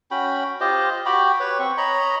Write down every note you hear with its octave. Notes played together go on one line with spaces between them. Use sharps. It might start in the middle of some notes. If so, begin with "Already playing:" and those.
C#4 F#4 G5 B5
F4 G4 C5 D#5
F#4 G4 G5 B5
B4 C#5
C4 C#6
C#5 D#5 A#5 B5